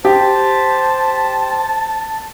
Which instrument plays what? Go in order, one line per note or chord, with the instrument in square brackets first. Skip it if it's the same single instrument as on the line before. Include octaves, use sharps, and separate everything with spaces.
[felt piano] G4 [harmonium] C5 [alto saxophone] A5